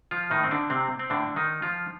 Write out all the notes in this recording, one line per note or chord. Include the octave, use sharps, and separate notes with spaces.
F3 F4
A2 D#3 D#4
C4
D3 D4
C3 C4
C4
A2 D3 D4
D#3 D#4
F3 F4